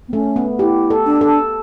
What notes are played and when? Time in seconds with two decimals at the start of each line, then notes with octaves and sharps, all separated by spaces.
0.08 B3
0.13 A3 C#4
0.36 B3
0.59 E4 G4
0.90 A4
1.06 D4
1.21 A4